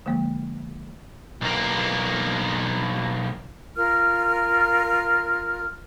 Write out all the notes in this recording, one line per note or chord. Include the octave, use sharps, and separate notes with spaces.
D3 F3 G#3 A#3
B1 A#3
F4 A#4 F6